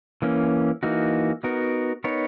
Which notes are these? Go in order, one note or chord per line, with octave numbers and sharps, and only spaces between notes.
E3 A#3 C#4
E3 A#3 D#4 F#4
B3 D#4 F#4 A#4
B3 D#4 A#4 C#5